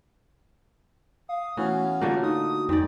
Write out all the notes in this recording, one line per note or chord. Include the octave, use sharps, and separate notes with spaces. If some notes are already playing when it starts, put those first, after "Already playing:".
F5 D#6
E3 A3 B3 C#4 F#4 F5
D3 A3 A#3 F4
D#4 D#6
F2 G#2 D5 G5